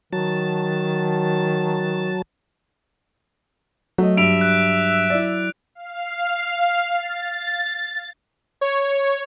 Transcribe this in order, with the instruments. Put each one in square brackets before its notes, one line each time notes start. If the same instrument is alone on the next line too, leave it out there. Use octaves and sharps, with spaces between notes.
[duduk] D#3 [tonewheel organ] F#3 A5
[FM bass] F#3 [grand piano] A3 D#5
[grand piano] G2 [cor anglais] E5 [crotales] D7 F7
[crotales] F#6
[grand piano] E4 D5
[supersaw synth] F5
A6
C#5